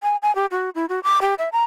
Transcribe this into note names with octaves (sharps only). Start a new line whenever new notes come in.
G#5
G#5
G4
F#4
E4
F#4
D6
G4
E5
A#5